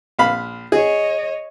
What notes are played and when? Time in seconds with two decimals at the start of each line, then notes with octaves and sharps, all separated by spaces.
0.18 A#1 F5 B5
0.72 G#4 C#5 D#5